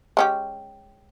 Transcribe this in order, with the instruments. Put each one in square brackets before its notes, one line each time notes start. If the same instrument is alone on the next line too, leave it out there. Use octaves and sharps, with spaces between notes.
[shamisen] G#3 C#4 G4